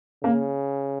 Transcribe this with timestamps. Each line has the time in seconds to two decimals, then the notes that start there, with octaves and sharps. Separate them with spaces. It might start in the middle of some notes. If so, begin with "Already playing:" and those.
0.23 C#3 A#3